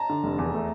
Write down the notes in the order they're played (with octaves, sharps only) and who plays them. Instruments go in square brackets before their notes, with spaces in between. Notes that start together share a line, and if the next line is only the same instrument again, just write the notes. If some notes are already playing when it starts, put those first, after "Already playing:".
Already playing: [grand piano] A5 A#5
[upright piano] D3
F1
E2
A3